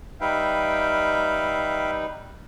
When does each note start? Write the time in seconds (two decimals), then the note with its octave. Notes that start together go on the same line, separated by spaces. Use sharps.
0.21 G3 D#4 B4 E5 F5 G5